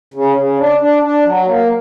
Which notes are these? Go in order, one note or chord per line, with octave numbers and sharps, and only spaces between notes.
C#3
C#3
D4
D4
D4
F#3
A#3